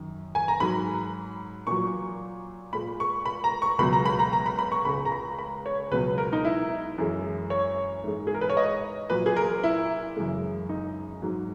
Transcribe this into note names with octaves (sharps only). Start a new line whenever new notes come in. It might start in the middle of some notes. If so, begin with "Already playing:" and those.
Already playing: F#2 D#3
G#5
A#5
G#2 F#3 B5
A#2 F#3 C#6
A#2 G#3 B5
C#6
B5
A#5
C#6
C#2 B2 F#3 B5
A#5
B5
A#5
A#5
B5
B5
C#6
C#2 C#3 G#3 B5
A#5
B5
B5
C#5
C#2 B2 F#3 B4
A#4
D#4
E4
F#2 E3 G#3
C#5
G#2 E3 G#3
G#4
A#4
B4
C#5
D#5
A#2 F#3 B4
G#4
A#4
E4
F#2 C#3 E3 G#3
D#4
G#2 F#3